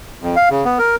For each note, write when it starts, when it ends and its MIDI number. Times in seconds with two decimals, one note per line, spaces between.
0.22 0.36 41
0.36 0.49 77
0.50 0.64 49
0.65 0.78 59
0.79 0.96 70